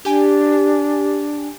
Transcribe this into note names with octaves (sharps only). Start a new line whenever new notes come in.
D4 G4 G#5